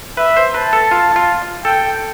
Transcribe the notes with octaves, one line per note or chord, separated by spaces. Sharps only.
B4 E5
C5
B4 A5
A4
F4
F4
A4 G5